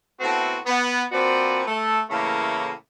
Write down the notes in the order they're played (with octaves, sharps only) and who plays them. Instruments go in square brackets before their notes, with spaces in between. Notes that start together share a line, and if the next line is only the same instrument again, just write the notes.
[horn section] A2 A3 B3 C4 F#4
B3
F3 A#3 C4 F#4 B4 D5
A3 A4
A2 C#3 E3 A3 A#3